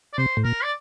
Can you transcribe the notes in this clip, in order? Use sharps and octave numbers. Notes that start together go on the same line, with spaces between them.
D5
C3 C5
A2
A#2 A#4
D5